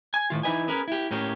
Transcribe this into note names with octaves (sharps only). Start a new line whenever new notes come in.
G#5
A2 D#3 F4
E3 D#4 E4 B4 D#5 G#5
C#4 G#4 A#4 B4
E4 G4
A2 A#3 C#4 G4